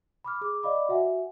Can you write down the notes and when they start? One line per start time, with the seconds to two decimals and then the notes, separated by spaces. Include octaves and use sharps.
0.24 B5 D6 F6
0.41 G#4 D6
0.63 D5 D#5 F5 B5 D6
0.89 F#4 E5 F#5 G#5